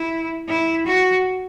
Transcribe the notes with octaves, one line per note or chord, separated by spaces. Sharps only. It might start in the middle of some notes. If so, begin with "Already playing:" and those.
Already playing: E4
E4
F#4